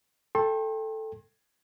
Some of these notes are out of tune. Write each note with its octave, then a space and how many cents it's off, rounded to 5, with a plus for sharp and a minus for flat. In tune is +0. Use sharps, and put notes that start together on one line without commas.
A4 +0 G5 +15 C6 +45